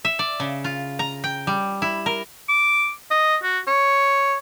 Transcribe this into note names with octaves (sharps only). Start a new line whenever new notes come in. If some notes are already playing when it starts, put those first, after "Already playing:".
E5
D5
C#3
F4
A#5
G5
G3
E4
A#4
D6
D#5
F#4
C#5